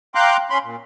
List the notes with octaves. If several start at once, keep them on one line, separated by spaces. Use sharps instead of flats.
F5 G5 A#5 C6 D6 F#6
C#4 B5 C6
A#2